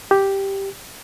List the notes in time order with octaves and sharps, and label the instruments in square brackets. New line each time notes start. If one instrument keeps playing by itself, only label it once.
[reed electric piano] G4